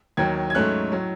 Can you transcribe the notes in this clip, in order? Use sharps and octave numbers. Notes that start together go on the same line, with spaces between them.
D#2 D#3 F#3 G#6
G#6
G#2 F#3 A3 C#4 F#6
A2 F#3